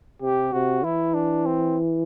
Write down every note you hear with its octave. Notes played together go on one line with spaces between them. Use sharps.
C3 G4
C3 F#4
E3 E4
D4
C4